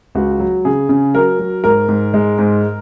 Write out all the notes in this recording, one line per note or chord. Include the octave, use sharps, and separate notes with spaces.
C#2 F#4
F#3
C#3 G#4
C#3
F#3 A#4
F#3
G#2 A#4
G#2
G#3
G#2